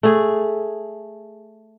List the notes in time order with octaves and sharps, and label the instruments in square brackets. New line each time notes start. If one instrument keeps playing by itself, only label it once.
[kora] A3 G#4